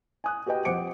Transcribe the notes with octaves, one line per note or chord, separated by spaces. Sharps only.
G#5 D#6 F#6
F#4 G4 B4 D#5 G5
F2 C5 F#5 D6 C#7 D7